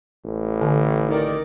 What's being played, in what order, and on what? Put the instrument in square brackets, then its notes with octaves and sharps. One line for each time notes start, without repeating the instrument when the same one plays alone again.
[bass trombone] A1
[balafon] D3
[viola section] D#3 A#4 D5